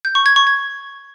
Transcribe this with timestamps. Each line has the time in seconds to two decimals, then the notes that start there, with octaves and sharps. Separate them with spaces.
0.05 G6
0.15 C#6
0.26 G#6
0.36 C#6
0.47 G#6